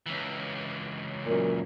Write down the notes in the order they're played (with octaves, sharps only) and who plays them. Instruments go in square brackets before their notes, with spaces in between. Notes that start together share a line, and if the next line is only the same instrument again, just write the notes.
[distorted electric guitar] C#2 E3
[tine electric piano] F#2 A#2 [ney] A#4